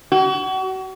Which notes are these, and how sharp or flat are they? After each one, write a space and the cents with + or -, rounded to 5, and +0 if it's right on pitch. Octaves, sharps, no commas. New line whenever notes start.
F#4 +35